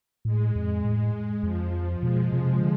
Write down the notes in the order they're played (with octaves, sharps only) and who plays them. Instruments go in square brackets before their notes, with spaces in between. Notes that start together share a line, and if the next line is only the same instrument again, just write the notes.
[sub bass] A2 [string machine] G#3
[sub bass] F2
A2
[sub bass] F2 [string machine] F3
[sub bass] B2 [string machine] G#3
[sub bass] C3 [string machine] F3
[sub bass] D3